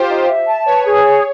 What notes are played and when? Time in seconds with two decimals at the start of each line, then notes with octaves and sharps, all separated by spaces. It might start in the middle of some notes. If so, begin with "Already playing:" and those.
Already playing: F4 G4 C5
0.09 D#4
0.28 E5
0.47 A5
0.66 B4 C#5
0.85 G#4
1.03 C#5